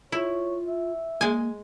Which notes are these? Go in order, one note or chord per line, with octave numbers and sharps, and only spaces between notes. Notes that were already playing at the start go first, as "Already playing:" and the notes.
E4 F4 C#5
E5
G#3 A#3 G#5